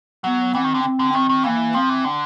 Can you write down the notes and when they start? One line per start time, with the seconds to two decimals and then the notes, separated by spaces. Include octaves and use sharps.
0.24 F#3 B3
0.55 E3 C4
0.64 D#3
0.74 D3
0.84 C4
0.99 D3
1.14 D#3 C4
1.29 D#3
1.44 E3 A#3
1.74 F3 C4
1.89 E3
2.04 D3